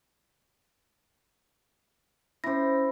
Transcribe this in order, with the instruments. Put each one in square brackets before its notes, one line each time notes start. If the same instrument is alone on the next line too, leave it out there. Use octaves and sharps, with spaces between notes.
[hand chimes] C#4 A#6 [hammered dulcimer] E4 C5